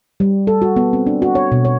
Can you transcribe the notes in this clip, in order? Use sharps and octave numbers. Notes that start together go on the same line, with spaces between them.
G3
A4
F#4
B3
C4
D4
F#4
C#5
B2
C#5